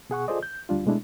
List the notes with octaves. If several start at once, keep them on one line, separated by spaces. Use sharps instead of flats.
B2 G#4 F#5 C#6
F4 G#4 A4 C5 D5 D#5
G6
D2 G3 D4 F4
B2 G#3 A3 D4 E4